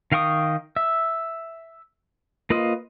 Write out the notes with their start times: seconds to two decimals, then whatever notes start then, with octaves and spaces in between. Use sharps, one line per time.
0.12 D#3 F5 G5 C#6 D#6
0.76 E5
2.50 A#3 F4 B4 C5 D#5